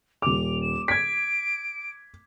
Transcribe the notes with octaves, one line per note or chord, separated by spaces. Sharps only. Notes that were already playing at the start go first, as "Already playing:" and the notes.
D#1 D6 F7
E7
G#6 B6 D7